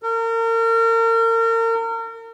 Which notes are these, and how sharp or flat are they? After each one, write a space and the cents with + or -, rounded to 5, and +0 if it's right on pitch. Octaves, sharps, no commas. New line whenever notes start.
A#4 -35